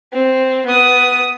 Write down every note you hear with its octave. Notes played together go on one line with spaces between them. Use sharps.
C4
B3 D#6